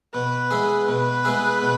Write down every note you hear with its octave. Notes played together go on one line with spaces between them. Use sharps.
B2 B4
G#3 B3 E4 G#4
B2 B4
G#3 B3 E4 G#4
B2